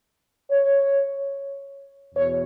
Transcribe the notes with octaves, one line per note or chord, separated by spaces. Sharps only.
C#5
E2 B2 C#5